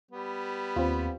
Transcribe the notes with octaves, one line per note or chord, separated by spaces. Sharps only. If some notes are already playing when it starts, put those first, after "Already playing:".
G3 B3
D#2 C4 F4